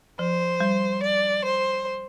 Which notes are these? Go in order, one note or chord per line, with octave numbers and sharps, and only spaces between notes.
F3 C5
G3
D5
C5